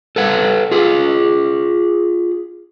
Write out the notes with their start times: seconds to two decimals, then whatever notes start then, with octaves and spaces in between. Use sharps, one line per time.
0.16 A4 B4 F#5
0.71 F4 G#4